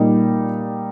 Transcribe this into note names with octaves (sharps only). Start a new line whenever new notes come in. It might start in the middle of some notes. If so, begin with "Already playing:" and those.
Already playing: A#2 G3 A#3 D#4